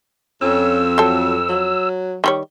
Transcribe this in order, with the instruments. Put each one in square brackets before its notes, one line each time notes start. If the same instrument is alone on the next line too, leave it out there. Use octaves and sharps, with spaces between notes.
[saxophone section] F2 [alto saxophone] C#4 [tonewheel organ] E6
[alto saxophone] F#3 [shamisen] C4 A4
[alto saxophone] F#3
[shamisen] D#3 G3 C#5